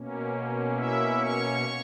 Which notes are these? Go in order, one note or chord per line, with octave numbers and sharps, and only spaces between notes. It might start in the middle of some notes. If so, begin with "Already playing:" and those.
Already playing: B2 A#3 C#4
E4 E5
C#5 C#6